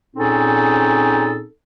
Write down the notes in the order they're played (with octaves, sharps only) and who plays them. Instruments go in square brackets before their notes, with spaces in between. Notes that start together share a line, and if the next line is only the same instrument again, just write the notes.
[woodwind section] A#2 C4 C#4 D#4 G#4 A4